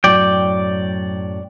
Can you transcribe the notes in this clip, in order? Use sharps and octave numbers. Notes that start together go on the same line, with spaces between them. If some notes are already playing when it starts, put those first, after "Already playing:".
F#2 A2 F#3 D5 G5